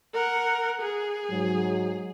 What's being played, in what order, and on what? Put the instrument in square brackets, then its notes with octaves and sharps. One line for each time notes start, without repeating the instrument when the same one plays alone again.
[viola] A#4 F#5
G#4
[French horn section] G#2 F#3